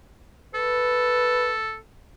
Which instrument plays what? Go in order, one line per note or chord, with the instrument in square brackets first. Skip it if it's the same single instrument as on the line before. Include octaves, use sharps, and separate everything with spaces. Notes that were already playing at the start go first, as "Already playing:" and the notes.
[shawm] A4 [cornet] B4